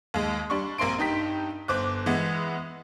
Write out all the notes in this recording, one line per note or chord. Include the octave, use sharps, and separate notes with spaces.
D#2 G#3
G3 D4 C6 C#6
A#1 A#3 C4 C6 D7
G2 D#4 G4 B6
G1 C5 D6 F#6
E3 G#3 B3 E4